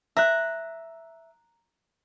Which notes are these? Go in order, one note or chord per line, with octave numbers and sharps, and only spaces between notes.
E5 A#5 F#6